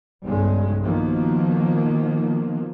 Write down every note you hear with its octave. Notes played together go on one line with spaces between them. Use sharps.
B1 G2 C#3 G3 G#3
B2 D#3 F3 A#3